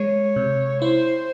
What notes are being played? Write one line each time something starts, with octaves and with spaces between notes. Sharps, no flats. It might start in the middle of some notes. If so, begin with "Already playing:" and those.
Already playing: G#3 C#5
C3
E4 C5